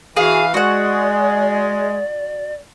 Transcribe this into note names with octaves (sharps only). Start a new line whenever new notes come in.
E3 F#4 G#4 F5
G#3 F#4 D5 F#5